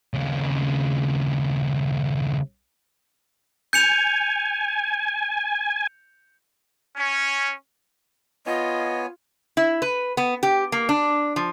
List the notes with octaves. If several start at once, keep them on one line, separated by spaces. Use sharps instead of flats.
D#2 C#3
G#5 G6 C#7 F7
C#4
B3 F4 C#5 D#5 G#5
E4
B4
B3
G4
A#3
D4
F3